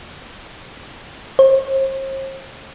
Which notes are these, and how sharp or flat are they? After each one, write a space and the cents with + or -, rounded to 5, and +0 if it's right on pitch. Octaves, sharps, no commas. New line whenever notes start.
C5 +40